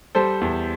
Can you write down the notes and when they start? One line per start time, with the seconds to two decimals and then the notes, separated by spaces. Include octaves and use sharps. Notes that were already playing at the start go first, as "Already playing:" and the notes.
0.15 G3 A4 C5
0.41 E2